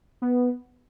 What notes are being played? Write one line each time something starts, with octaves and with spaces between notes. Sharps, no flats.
B3